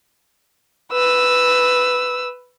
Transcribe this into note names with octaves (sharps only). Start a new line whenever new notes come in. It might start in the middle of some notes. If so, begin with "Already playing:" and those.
B4 E6